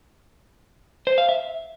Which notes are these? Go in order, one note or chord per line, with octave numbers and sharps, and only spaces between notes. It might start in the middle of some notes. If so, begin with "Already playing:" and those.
C5
F5
E5